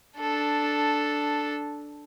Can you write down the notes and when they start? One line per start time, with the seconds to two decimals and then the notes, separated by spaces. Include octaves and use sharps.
0.20 D4 A4